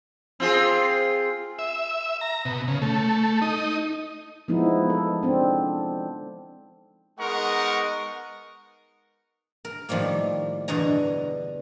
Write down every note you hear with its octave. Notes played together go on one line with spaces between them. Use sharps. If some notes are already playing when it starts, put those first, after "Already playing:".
C4 F4 G#4
E5
A#5
B2
C#3
A3
D#4
F3 G#3 B3 D#4 E4
A4
C4 D4
G#3 B3 D#4 A#4 F#5 C#6
A#4
A2 D#3 F3 G3 A#3
E2 G2 B2 D3 G#5 A#5